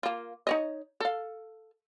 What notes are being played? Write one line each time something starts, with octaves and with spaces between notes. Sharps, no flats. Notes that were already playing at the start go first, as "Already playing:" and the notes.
A#3 F4
D#4 C#5 D#5
A4 F5